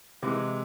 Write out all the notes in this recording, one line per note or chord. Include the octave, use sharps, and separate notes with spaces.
C3 E3 G#3